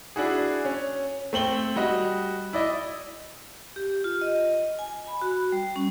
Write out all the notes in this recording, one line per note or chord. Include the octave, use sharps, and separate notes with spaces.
D4 E4 F#4 G#4
C#4
A3 C4 F#7 G7
G3 F#4 D#5
E4 D5 D#5
G4
F4
D#5
G#5
B5
F#4
G3
C#4